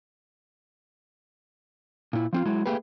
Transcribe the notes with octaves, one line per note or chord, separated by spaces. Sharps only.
A#2 E4
F3 C4 F4
F#3 G#3 E4
A3 A#3 G4 G#4 B4